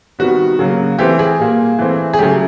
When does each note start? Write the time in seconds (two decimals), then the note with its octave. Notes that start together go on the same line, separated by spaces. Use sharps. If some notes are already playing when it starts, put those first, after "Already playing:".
0.19 C3 D#3 G3 B3 F#4
0.59 C#3 F#3 A#3
0.98 E3 A3 C4 G4
1.19 G#4
1.39 A#2 G3 A#3
1.79 E3 A3 C4
2.14 G#4
2.19 C#3 F#3 A3 G4